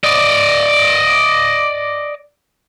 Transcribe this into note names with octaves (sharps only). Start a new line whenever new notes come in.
D5 D#5